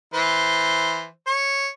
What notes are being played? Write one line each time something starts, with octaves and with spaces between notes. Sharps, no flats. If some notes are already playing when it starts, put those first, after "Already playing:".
E3 B4 C5
C#5